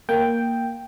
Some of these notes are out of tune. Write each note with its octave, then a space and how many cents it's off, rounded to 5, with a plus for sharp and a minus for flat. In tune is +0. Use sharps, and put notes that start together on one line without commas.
A#3 +0 G5 +0